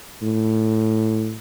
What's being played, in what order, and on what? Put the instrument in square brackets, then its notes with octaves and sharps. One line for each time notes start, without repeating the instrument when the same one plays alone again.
[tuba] A2